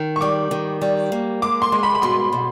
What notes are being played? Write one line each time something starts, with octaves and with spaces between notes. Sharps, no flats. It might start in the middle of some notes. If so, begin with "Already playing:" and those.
Already playing: D#3
C#6
G3 D6
D#3
G3
A#3
G#3 D6
C6
G#3
B5
B5
B2 C6
B2